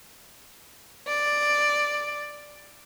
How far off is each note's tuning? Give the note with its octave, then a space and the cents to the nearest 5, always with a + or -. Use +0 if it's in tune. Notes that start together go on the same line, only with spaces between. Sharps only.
D5 +5